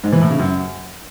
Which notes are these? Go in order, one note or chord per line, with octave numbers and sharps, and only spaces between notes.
G#2
E3
A2
C#3
F#2